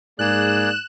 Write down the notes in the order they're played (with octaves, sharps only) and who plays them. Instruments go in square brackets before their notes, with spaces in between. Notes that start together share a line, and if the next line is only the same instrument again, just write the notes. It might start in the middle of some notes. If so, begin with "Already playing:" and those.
[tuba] G#2 [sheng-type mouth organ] A#3 G#4 D5 [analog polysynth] F#6 E7